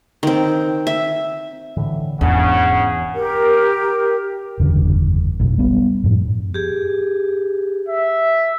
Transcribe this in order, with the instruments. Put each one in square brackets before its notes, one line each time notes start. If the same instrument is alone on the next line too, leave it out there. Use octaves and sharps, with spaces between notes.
[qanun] D#3 C4
E5
[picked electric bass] A2 D3 E3
[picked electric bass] E1 G#2 D4 [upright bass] E2 [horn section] C#3 [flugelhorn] F#5
[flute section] G4 A#4
[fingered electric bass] F#1 E2 G2 D3
F1 B1
G3 B3
F#2 A2 F3
[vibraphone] G4 G#4
[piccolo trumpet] E5